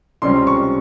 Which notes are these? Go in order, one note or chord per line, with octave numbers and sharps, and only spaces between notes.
C#2 C3 G3 C#4 C6
C#6